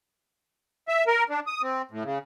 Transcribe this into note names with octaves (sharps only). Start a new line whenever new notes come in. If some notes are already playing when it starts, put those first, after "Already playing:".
E5
A#4
D4
D#6
C4
A2
C#3